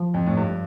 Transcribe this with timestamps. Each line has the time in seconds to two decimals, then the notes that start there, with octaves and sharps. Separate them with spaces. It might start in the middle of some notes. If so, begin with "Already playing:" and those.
Already playing: F3
0.14 F2
0.26 A2
0.37 G2